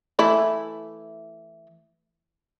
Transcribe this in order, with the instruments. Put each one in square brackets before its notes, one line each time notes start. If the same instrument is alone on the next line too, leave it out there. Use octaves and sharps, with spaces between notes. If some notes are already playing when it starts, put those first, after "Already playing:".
[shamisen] E3 A3 E4